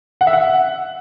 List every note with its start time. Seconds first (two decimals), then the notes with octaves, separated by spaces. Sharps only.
0.21 F#5
0.27 E5
0.33 F#5